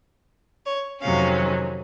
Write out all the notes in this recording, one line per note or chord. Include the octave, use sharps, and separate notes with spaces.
C#5
F2 C3 D#3 F#3 C#4 F5